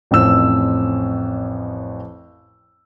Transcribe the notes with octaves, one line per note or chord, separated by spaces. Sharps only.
A1 F2 C4 C#4 E6 E7